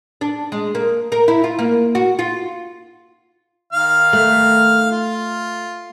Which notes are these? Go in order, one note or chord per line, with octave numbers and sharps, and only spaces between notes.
D4
G#3
A#3
A#4
E4
F4
A#3
F#4
F4
D#3 F5 F6
A3
F4